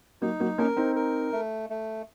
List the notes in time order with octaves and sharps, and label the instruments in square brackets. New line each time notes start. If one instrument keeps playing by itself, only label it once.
[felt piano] F#3 A#3 [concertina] D#4
[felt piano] F#3 A#3
[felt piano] A#3 C#4 [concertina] A#4
[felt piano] C4 D#4
[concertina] A#4
A3
A3